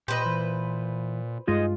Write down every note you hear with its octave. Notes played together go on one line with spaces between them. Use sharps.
A#2 G4 B4 C5 D#5
E3
G2 G#3 D#4 F4 G#4 D#5